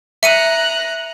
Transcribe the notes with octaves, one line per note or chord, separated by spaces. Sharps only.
E5 A#5 F#6 C#7 D#7